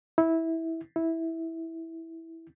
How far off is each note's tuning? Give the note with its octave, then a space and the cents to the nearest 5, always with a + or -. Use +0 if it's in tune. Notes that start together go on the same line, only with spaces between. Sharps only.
E4 -15
E4 -10